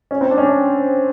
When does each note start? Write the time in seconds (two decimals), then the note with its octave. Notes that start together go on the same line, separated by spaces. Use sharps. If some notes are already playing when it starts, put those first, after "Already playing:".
0.11 C#4
0.21 C4
0.31 D4
0.38 C#4
0.42 D4